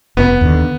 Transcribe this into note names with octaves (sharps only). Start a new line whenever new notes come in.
F1 B3
D#2 D3